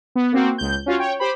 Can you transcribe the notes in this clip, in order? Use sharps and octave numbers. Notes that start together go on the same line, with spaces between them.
B3
A#3 C4 F#4
C#2 G6
C#4 F4 F#4 C#5
C#5 G5
G4 C5 B5